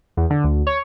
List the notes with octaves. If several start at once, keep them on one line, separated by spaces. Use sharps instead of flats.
E2
D3
D2
C#5